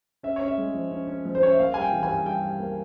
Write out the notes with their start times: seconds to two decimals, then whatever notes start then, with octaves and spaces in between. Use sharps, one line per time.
0.23 C#4 E5
0.36 C#5
0.41 C#4
0.48 E5
0.58 G#3
0.75 F3
0.91 C#4
1.08 C#4
1.25 F3
1.35 C5
1.42 C#4 C#5
1.51 E5
1.58 A#3 F5
1.74 G3 G#5
1.82 G5
1.93 E3
2.03 G#5
2.09 G2
2.25 G2 G5
2.43 G3
2.60 A#3